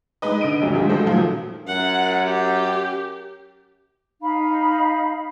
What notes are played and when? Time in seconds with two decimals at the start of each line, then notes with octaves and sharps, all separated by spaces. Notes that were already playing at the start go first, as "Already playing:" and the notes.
0.22 G#3 D#4 B4 D#5
0.41 D3 D#5 D7 D#7
0.62 G#1 D2 F#3 G3
0.74 D3 D#3 F3 G3 G#3 D#4
0.89 C#3 G#3 F#4 G#4 A4 C5
1.05 A#2 D#3 F3 F#3 A3
1.68 F#2 F#5
2.26 G4
4.20 D#4 F5 B5